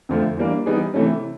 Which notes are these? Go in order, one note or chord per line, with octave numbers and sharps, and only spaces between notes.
F2 D3 F3 A3
E3 G3 A#3 D4
E3 G3 B3 D#4 G#4
C3 E3 A3 C#4